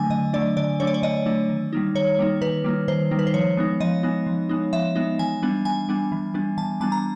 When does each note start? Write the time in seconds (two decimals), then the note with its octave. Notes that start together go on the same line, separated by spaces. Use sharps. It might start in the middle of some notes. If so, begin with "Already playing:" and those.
Already playing: D3 F#3 A3 D4 G#5
0.10 D3 D#5
0.33 F#3 A3 D4 D5
0.57 D3 D5
0.80 F#3 A3 D4 C#5
0.87 D5
0.94 C#5
1.03 D3 D#5
1.26 F#3 A3 D4
1.49 D#3
1.73 G3 A#3 D#4
1.95 D#3 C#5
2.19 G3 A#3 D#4
2.41 D#3 B4
2.64 G3 A#3 D#4
2.88 D#3 C5
3.11 G3 A#3 D#4
3.19 B4
3.27 C5
3.34 F3 C#5
3.57 G#3 B3 D#4
3.80 F3 D#5
4.03 G#3 B3 D#4
4.27 F3
4.49 G#3 B3 D#4
4.73 F3 E5
4.96 G#3 B3 D#4
5.19 E3 G#5
5.42 G3 B3 D4
5.65 E3 G#5
5.89 G3 B3 D4
6.12 E3
6.34 G3 B3 D4
6.57 E3 A5
6.80 G3 B3 D4 A5
6.92 A#5